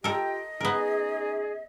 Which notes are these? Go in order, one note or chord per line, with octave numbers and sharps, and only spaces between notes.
F4 G4 A4 A#4 D#5 G5
B3 C#4 D#4 G#4 A#4